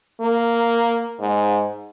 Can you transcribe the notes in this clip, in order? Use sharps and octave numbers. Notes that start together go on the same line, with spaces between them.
A#3
G#2